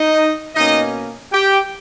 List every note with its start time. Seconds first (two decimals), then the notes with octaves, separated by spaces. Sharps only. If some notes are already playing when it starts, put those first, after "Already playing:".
Already playing: D#4 D#5
0.55 B2 A#3 C#4 D#4 D#5
1.33 G4 G5